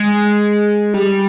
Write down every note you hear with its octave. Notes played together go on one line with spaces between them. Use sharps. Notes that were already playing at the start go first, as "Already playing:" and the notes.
Already playing: G#3
G3